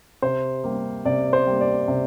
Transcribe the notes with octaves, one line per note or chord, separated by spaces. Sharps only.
C3 C5
G3 A#3
C3 D5
C5
G3 A#3
D5
C3